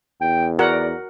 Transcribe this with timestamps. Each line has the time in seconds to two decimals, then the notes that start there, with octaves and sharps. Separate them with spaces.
0.21 E2 G5
0.59 F#4 A#4 D5 F#5